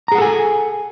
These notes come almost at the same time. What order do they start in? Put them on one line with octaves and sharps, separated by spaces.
A#5 G#4 F#5 A4 G#5